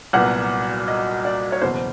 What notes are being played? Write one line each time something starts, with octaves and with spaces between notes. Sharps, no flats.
C2 A#2 F#3 B3 F#5
D#5
D5
C#5
F#1 E2 B2 C5